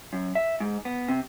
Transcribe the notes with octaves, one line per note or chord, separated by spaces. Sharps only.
F#2
E5
G#2
B3
C3